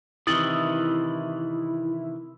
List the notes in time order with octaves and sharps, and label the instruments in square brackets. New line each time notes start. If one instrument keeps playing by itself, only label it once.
[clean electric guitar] C3 D#3 E3 [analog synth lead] E4 [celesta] D#6 A6 F#7